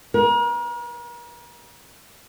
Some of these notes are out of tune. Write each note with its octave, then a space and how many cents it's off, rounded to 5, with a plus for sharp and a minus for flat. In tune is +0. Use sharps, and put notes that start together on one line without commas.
A#4 +40